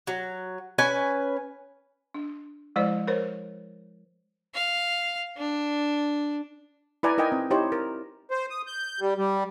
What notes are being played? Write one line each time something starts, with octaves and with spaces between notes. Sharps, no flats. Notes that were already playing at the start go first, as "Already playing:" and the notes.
F#3
C#4 B4 G#5
D4
F3 G#3 E4 C5 D5
A#4 C5 C#5
F5
D4
E4 B4 D5 G#5 A#5
D#4 A#4 D#5 G5 G#5
C4
D#4 E4 G4 C5 C#5
A#4
C5
D#6
G6
G3
G3